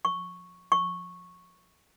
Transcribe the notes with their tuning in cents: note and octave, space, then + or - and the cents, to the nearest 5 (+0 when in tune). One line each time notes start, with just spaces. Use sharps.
C#6 -5
C#6 -10